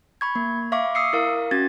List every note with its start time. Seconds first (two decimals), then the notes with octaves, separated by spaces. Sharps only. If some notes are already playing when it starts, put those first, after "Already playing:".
0.21 B5 C#6 G#6
0.35 A#3
0.72 E5 F5 C#6 D6
0.95 D#6 E6 C7 C#7
1.13 E4 A#4 F5
1.51 C#4 F#4 G#6 A6